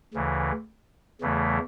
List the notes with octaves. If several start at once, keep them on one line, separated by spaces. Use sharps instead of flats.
D2 C#3 E3
E2 C#3 E3 A3